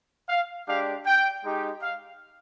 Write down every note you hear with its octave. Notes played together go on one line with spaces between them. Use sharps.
F5
G#3 D4 G4 F5
G5
G#3 D#4 G4
F5